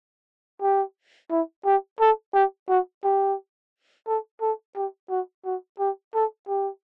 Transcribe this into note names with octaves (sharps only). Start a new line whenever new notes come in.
G4
E4
G4
A4
G4
F#4
G4
A4
A4
G4
F#4
F#4
G4
A4
G4